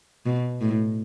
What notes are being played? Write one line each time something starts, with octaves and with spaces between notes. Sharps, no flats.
B2
A2